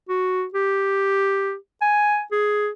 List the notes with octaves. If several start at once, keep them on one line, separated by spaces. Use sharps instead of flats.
F#4
G4
G#5
G#4